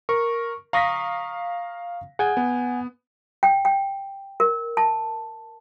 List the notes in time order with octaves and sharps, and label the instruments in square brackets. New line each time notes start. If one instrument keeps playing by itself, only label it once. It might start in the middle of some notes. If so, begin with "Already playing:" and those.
[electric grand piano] A#4 [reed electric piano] C#6
[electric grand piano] F5 A#6 B6 [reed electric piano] A#5 C#6 D#6
[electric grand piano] G#4 [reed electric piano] F#5 G#5 G#6
[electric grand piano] B3
[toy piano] G5
G5
A#4
A5